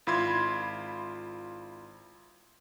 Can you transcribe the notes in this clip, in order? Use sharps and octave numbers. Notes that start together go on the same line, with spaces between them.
G#1 E4 F4 B5 C6 G#6